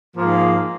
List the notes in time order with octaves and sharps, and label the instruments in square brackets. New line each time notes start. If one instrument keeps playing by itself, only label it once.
[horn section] G#2 F3 A#3